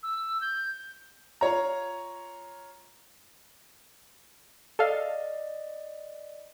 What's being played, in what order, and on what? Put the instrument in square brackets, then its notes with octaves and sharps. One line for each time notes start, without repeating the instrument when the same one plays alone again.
[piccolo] E6
G6
[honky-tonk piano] F4 C#5 A#5
[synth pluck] A4 F5 [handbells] D5 D#5